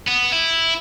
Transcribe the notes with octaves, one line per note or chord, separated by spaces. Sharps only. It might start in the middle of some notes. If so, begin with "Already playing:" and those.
B3
E4